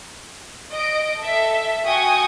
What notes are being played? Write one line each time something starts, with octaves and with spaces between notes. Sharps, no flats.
D#5 D7
A4 E5
F#4 G5 G#5 C#6 D#6